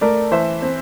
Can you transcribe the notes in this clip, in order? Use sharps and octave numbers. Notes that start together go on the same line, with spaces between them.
A3 A#4 D5
E3 C5 E5
C4